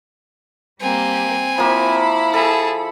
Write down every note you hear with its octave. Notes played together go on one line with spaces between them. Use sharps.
G3 A#3 C4 G4 G#5
F3 A#3 E4 B5
G#4 A4 A5